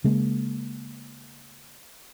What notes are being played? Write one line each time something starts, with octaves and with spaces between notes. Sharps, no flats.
C#3 G#3 A#3